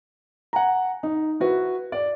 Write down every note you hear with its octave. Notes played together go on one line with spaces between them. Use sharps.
F#5 G#5 A#5
D#4
E4 F#4 B4
D5